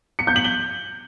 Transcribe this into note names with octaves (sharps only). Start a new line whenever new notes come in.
C#7
G6
F#7
G7